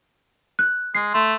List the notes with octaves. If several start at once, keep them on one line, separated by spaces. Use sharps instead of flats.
F#6
G#3 C7
A3 C6